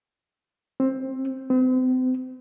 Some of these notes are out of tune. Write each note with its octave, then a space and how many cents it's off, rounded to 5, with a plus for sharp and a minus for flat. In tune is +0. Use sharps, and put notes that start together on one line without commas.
C4 +15
C4 -40